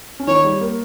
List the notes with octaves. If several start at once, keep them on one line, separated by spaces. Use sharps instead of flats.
C#4
D#3 D#4 C#5
G3 G4
A#3 A#4